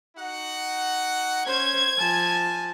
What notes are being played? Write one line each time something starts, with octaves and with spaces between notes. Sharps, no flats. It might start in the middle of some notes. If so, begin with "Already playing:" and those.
D#4 F#4 F#5
C#4 C5 G#6
F3 G#5 A5